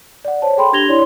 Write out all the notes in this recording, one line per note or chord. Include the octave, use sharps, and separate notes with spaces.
D5 F#5
C5 C#5 A5
G#4 A4 G5 B5 C6
D4 G4 G#6 A#6 F7 G7
E4 C#5 D5 C6